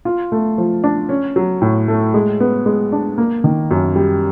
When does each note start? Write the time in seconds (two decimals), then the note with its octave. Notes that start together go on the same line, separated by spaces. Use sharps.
0.05 F4
0.32 A3
0.58 F3
0.84 D4
1.09 C#4
1.36 F#3
1.62 A2
1.88 A3
2.14 G#3
2.40 B3
2.66 G#3
2.92 D4
3.18 A#3
3.44 D#3
3.71 F#2
3.96 G3